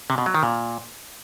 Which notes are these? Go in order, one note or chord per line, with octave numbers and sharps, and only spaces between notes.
C3
B2
F#3
D#3
A#2